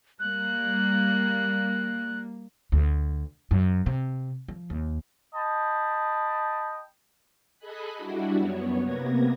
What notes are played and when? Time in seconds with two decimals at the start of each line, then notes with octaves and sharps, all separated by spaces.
0.20 G3 A#3 F#6
2.72 D2
3.51 F#2
3.86 C3
4.48 F3
4.70 D#2
5.34 D#5 G5 A5 B5
7.58 G#4 A4 D#5 G#5 B5 F#6
7.97 G3 D4 E4 F#4
8.36 F#2 B3 C#5
8.81 C3 A#3 B3 G#6 A#6